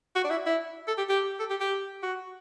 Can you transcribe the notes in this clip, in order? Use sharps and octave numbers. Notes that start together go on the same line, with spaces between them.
F#4
D4
E4
E4
A4
G4
G4
A4
G4
G4
F#4